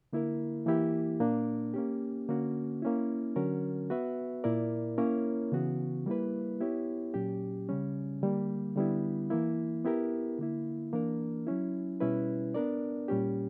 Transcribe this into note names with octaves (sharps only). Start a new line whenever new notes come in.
D3 A#3 E4 A#4
E3 A#3 E4 G4
A#2 A#3 D4
A#3 C#4 G4
D3 A#3 C#4 F#4
A#3 C#4 E4
D3 F#3 C#4 F#4 A#4
B3 F#4 B4 E5
A#2 A#3 E4 A#4 D5
A#3 C#4 E4 A#4 C#5
C#3 E3 B3 F#4
G3 A#3 E4 B4
B3 E4 G4 C#5
A#2 F#3 C#4 G4
C#3 G3 C#4
D3 G3 A#3
D3 G3 B3 E4
E3 A#3 E4
B3 E4 G4 A#4
D3 A#3 E4
E3 A#3 D4 A#4
F#3 C#4 E4
B2 G3 C#4 E4 B4
B3 D4 A#4 D5
A#2 G3 C#4 G4